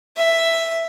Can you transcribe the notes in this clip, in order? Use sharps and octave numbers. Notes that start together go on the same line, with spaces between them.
E5